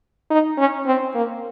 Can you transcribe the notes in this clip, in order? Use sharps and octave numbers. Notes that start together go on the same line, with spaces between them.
D#4
C#4
C4
A#3